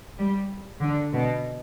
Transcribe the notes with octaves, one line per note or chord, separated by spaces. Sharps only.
G3
D3
B2